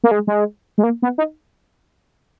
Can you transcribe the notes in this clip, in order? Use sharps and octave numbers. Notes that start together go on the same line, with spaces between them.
A#3
G#3
G#3
G#3
A#3
B3
D#4